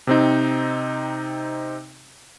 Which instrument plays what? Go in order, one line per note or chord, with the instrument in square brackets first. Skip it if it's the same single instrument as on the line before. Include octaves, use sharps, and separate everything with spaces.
[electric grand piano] C3 C4 D#4